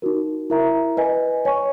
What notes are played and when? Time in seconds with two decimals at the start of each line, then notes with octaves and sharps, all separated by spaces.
0.02 D#4 F#4 A#4
0.50 E4 A#4 E5 A#5
0.97 B4 D#5 G#5
1.45 C#5 G#5 C#6